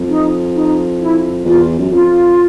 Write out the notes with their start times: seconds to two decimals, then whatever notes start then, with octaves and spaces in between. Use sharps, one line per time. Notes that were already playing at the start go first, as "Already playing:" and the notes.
Already playing: F2
0.08 D#4
0.54 D#4
1.00 E4
1.45 E2 F4
1.79 F#2
1.91 F2 F4